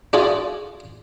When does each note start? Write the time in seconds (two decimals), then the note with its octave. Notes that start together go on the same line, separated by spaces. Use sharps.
0.13 D4 F4 F#4 G#4 A4